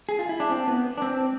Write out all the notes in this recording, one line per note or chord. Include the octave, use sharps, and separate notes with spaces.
G#4
F4
E4
D4
C4
B3
D4
C4